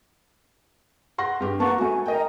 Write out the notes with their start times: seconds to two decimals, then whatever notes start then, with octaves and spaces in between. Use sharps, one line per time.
1.18 F#5 C6 A#6
1.40 G2 G4
1.60 A#3 B3 F#5 A5 A#5 C#6
1.78 A3 F#4 G#5
2.06 A#4 D#5 G5 A#5